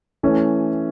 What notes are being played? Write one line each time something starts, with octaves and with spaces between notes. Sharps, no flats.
E3 A3 C#4